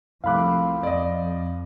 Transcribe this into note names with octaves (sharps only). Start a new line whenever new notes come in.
C2 F3 A3 C4 F5 B5 D6 F#6
F2 D5 D#5